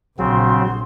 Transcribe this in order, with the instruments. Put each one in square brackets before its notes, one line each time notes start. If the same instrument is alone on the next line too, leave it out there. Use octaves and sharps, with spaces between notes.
[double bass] A#1 [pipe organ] C#3 C4 [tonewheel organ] F#3 [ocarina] C6